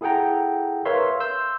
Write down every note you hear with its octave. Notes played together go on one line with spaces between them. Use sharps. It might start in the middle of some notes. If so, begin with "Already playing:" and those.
E4 G#4 A4 F#5 G5 A#5
A#4 B4 C#5 E5 F5 C6
C6 E6 G6